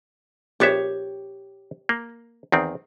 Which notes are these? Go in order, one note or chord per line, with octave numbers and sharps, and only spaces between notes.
A#1 B3 G4 C#5 E5
A#3
E2 D#3 C4